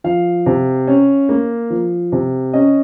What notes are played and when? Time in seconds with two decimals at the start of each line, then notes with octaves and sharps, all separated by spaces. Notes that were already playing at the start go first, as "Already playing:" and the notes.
0.04 F3 F5
0.46 C3
0.88 C#4
1.29 A#3
1.70 F3
2.12 C3
2.53 C#4 D#5